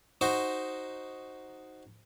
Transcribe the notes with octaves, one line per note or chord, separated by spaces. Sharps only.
D#4 F#4 C5